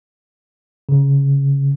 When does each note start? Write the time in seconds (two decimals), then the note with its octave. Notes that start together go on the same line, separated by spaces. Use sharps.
0.89 C#3